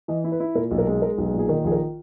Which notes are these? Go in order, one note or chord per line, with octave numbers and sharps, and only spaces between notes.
E3 D#5
E4
B4
E4
A#2 A#4
B1
A#4
G#3
G#3 A#4
B1
G#4
A#2
G#4
D#3 A#4
A#1 G#4
A#4